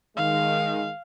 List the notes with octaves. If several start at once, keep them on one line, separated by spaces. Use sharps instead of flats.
D#3 G#3 F5